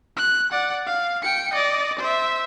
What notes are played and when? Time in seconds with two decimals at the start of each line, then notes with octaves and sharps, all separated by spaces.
0.17 F#6
0.51 D5 F#5
0.87 F5
1.22 G5 C#7
1.53 D5 D#5
1.99 C5 E5